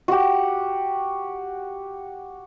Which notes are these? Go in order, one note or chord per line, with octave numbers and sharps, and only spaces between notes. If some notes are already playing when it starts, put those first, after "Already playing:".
F#4 G4